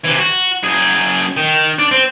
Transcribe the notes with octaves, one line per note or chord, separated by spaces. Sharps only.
C3 E3
F#4
F#2 G#4
D#3
D4
C4